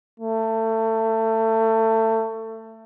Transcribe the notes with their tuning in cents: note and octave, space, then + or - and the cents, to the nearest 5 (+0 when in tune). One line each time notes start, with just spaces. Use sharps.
A3 +25